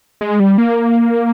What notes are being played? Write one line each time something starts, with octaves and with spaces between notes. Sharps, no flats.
G#3
G3
A#3